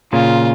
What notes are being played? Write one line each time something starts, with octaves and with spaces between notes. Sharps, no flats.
A#2 C#3 F4